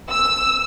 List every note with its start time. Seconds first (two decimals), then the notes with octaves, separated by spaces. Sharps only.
0.10 E6